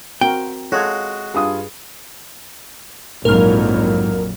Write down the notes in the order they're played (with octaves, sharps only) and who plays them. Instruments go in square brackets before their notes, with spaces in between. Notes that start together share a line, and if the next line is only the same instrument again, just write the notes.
[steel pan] C4 F#4 A#4 [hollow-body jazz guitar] G5
[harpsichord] G#3 F#4 [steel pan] F4 A4 C#5
[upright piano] G2 F4 D#6 [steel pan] G#4
[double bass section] A#1 F2 F#3 [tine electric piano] G#2 G#3 D#4 [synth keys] A#4 F6